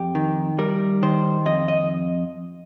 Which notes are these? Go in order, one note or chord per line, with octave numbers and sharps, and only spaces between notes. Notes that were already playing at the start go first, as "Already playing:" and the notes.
Already playing: F2 G4
D#3
G3 A#4
D#3 C5
F2 D#5
D#5